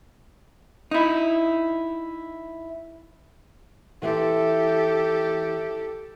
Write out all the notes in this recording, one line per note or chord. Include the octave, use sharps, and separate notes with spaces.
D#4 E4
E3 G4 A4 C5